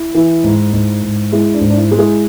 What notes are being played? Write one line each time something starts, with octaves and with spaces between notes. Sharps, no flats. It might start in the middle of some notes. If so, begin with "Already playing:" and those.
Already playing: E4
E3
G#2
G#2
G#2
G#3 E4
D4
G#2
D4
E4
G#3
E4 G#4